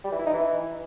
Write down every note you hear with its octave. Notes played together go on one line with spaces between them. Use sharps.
G3
E3
E4
D#4
E3